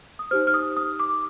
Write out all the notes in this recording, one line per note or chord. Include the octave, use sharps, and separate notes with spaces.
D#6
D#4 G4 C5 F6
F6
D#6
D#6
D6